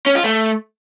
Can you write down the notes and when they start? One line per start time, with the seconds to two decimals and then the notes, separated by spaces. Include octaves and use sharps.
0.06 C#4
0.15 F4
0.24 A3